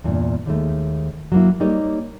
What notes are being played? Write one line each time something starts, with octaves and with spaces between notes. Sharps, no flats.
E2 G2 A#2
D#2 D#3 G#3 A3
F#3 A#3 E4
G3 A#3 D#4 A#4 C#5